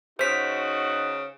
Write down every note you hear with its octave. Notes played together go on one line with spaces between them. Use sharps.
C#3 D#4 F#4 C5 B6